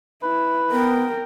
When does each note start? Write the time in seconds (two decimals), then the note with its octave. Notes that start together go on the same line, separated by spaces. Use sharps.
0.23 E4 B4
0.72 B3 A#4 G5